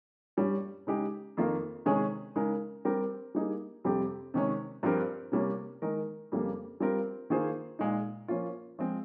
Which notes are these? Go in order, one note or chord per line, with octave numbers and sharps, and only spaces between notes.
G2 G3 C#4
C#3 G#3 D#4 G4
F2 D#3 A#3 F4 A#4
C3 D#3 G#3 C#4 G#4
C#3 G#3 D#4 A#4
G3 C4 G4 A#4
G3 A#3 D#4 G#4
F2 C3 G3 C4 G4
C3 D#3 G#3 C#4
G2 F3 C4 G4 A#4
C3 G3 A#3 C#4
D#3 G#3 D#4 A#4
F2 C#3 G3 A#3
G3 C4 F4 A#4
D#3 A#3 F4 G#4 C5
A#2 G#3 D#4
F3 A#3 C#4 F4
F3 G#3 C4